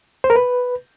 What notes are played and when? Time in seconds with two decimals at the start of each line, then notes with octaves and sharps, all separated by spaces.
0.24 C5
0.30 A#4
0.36 B4